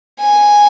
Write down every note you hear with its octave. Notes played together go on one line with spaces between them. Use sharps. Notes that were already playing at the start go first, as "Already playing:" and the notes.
G#5